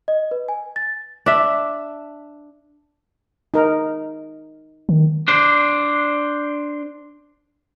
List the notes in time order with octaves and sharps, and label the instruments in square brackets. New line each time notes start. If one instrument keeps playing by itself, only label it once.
[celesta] D#5
B4
G#5
A6
[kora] D4 E5
[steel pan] D#4 A#4
[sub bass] D#3
[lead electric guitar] D4 C5